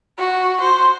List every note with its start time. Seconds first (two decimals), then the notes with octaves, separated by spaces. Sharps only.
0.18 F#4
0.61 C5